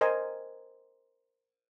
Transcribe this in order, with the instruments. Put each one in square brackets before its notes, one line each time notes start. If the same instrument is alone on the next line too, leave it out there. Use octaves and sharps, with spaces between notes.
[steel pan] A#4 C5 D#5 G#5